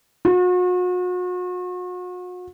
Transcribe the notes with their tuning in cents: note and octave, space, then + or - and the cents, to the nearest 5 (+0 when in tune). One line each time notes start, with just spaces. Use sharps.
F#4 -40